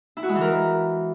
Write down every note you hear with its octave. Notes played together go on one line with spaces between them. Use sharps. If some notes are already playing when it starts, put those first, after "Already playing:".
E4
F#4
G#3
E3
A#4